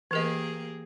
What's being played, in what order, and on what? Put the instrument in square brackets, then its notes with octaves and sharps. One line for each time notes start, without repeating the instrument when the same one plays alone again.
[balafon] E3 A#4 D#5 [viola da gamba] A#3 G4 G#4